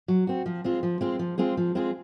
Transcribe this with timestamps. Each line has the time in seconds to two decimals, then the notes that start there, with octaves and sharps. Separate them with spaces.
0.08 F#3
0.27 C4 F#4
0.46 F3
0.64 G#3 C4 F4 G#4
0.83 F3
1.01 G#3 C4 F4 G#4
1.19 F3
1.38 G#3 C4 F4 G#4
1.57 F3
1.75 G#3 C4 F4 G#4